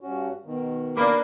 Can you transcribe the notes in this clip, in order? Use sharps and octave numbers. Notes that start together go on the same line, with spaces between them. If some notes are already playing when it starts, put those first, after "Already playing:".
G2 C#4 F#4
B2 D#3
A#3 D4 B4